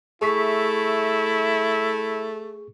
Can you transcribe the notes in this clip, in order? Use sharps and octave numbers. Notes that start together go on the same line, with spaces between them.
A3 E4 G#4 C#6 B6